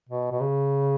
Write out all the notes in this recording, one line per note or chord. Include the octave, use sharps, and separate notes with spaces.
B2
B2
C#3